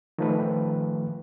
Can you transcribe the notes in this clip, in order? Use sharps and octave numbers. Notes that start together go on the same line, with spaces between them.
D#3 F3 A3 B4